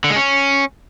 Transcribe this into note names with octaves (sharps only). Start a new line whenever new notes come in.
D3
G#3
C#4